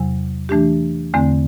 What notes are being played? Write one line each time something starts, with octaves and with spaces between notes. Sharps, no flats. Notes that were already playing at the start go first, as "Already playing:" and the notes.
Already playing: E2 C3 F#3
E3 A3 D4 G4
E2 D3 A3 C4